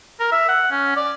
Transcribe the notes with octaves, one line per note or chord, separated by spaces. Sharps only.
A#4
E5
F#5
C#4
D5